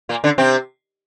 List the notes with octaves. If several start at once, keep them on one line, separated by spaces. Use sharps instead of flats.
A#2 A#3
D3 D4
C3 C4